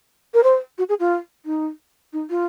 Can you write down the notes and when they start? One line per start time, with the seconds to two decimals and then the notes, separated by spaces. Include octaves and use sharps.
0.34 A#4
0.43 C5
0.78 F#4
0.89 G#4
1.00 F4
1.45 D#4
2.13 D#4
2.30 F4